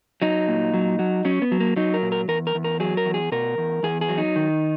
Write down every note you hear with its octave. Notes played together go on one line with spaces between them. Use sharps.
F#3 D#4
A#2
F#3
F#3
F#3 C#4
B3
F#3
A#3
F#3 D#4
A#4
A#2
A#4
E2 A#4
A#4
E2
A#4
F#3 G#4
A#4
E2
G#4
B2 A#4
E2
E2 G#4
G#4
F#3
D#4
D#3